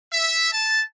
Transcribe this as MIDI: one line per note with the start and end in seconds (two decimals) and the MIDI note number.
0.12 0.50 76
0.52 0.82 81